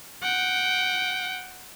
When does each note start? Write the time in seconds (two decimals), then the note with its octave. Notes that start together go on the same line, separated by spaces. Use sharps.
0.23 F#5 G5